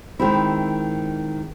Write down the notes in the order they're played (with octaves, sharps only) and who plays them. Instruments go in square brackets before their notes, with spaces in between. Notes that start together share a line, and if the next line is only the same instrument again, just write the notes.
[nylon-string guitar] D#3 G#3 C4 E4